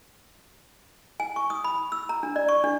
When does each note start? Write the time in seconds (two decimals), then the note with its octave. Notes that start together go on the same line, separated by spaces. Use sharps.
1.20 G#5
1.36 C#6
1.50 D#6
1.64 B5
1.92 E6
2.09 A#5
2.23 D4
2.36 D5
2.49 C#6
2.64 D4